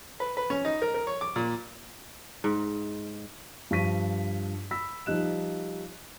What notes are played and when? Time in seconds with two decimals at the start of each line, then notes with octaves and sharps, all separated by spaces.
0.20 B4
0.37 B4
0.50 C#4
0.65 D#4
0.82 A#4
0.94 A#4
1.07 C#5
1.21 D6
1.36 A#2
2.44 G#2
3.71 G2 F3 C#6 B6 D#7
4.71 B5 E6 B6
5.06 F3 G3 D#4 F#6 E7